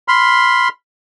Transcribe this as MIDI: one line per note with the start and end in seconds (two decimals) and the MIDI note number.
0.08 0.69 83
0.08 0.69 84
0.08 0.69 89